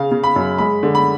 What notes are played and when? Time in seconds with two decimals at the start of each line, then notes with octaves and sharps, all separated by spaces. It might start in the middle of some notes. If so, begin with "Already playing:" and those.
Already playing: C#3 F5
0.11 C#3
0.24 B5
0.36 F#2
0.58 G#3 B5
0.83 D3
0.95 B5